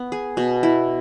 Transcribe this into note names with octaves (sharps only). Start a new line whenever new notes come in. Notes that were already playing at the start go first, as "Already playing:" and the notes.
Already playing: B3
G#4
B2
E4